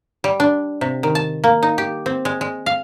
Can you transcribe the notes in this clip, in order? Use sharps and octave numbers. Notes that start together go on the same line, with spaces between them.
G3
D4
C3
D#3
A5
A#3
D#4
G4
C4
G#3
G#3
F5